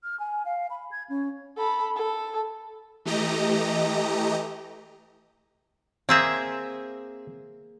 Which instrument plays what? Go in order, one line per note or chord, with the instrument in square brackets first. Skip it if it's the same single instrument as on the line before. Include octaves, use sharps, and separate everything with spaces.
[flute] F6
G#5
F5
B5
G#6
C#4
[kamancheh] A4 B5
A4
[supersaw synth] E3 A3 G4 D#5 A#5
[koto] A#3 G#4 E5 [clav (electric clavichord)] C4